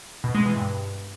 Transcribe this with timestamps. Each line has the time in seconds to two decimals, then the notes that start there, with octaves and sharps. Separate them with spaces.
0.24 B2
0.35 G#3
0.45 E3
0.56 G2